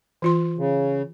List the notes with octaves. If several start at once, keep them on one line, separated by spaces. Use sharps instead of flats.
E3 F4 C6
C#3